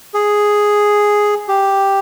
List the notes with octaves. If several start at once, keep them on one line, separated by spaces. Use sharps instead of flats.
G#4
G4